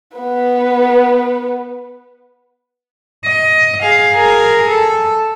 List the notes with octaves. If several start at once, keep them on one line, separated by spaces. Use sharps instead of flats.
B3 B4
D#5
G#4 F5
G#4 A#4
A4